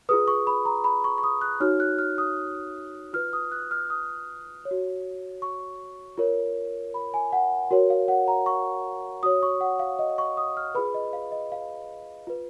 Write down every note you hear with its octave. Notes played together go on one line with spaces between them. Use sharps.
F4 G#4 B4 D#6
C#6
B5
A#5
B5
C#6
C#6
D#6
F#6
D#4 F#4 C#5 F6
F#6
F6
D#6
F4 B4 F6
D#6
F#6
F6
D#6
C#5
F#4
C#6
F4 A#4 C#5
B5
G#5
F#5
F#4 A#4 C#5
F5
F#5
A#5
C#6
F#4 C#5 D#6
C#6
F#5
F5
D#5
C#6
D#6
F6
F4 G#4 B4 B5
D#5
F5
D#5
F5
F4 B4